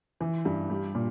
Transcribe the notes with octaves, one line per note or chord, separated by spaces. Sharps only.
E3
G2
G3
A#2